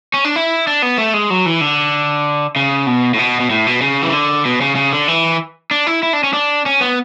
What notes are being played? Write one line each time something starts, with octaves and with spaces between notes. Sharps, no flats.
C#4
D4
E4
D4
B3
A3
G#3
F#3
E3
D3
C#3
B2
A2
B2
B2
A2
B2
C#3
E3
D3
B2
C#3
C#3
D3
E3
D4
E4
E4
D4
C#4
D4
C#4
B3